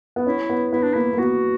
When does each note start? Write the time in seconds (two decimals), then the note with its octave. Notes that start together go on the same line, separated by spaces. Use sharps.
0.16 B3
0.27 C#4 E4
0.49 B3
0.73 B3 E4
0.83 D4
0.94 A#3 E4
1.13 A#3
1.18 B3 F#4